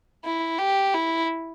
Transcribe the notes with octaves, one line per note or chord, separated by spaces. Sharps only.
E4
G4
E4